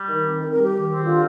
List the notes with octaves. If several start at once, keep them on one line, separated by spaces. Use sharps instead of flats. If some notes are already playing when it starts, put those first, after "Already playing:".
Already playing: G3
D#3
C4
D#3 A#4
A#4
G3
G4
D#3
C4
D3 F4